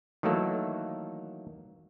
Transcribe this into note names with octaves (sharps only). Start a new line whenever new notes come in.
D#3 E3 F#3 A3 A#3 A4